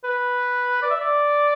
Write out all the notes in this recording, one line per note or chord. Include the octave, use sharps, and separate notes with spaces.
B4
D5
E5
D5